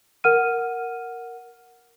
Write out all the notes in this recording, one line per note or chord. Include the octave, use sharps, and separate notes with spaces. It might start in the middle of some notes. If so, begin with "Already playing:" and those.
A#4 F#5 F6 D#7